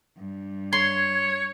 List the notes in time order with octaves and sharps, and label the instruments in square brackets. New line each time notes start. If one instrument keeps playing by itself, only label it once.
[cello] G2
[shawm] C#5 [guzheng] C6 [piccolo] G#6